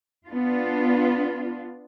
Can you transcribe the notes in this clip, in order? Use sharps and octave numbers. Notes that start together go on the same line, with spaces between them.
B3 D4 F4